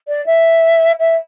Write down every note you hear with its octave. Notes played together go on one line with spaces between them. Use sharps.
D5
E5
E5